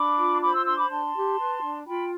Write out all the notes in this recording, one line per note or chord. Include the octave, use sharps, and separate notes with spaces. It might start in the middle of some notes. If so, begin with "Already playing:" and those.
Already playing: D4 B5 D6
F4
C5 B5 D6
C6 E6
D4 C6 E6
B5 D6
D4 A5 C6
G4
B4
D4
F4 G5 B5